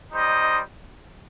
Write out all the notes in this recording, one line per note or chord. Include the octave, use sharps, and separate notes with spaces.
G3 D#4 C5 D#5